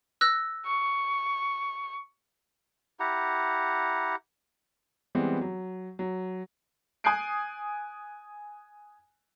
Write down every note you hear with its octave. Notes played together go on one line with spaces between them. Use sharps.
E6 F#6 A#6
C#6
E4 G4 F#5 A#5
E3 G3 G#3 B3 C4
F#3
F#3
G#5 D#6 F#6 G6 C7 D7